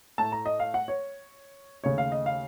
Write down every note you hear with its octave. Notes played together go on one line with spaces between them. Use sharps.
A2 A3 A5
A#5
D#5
F5
F#5
C#5
D#2 C#3 A3 C#5
F5
D#5
F5